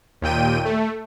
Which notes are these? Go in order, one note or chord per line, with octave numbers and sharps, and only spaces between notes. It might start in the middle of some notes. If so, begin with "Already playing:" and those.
D#2 A#2 G5 D#7
A3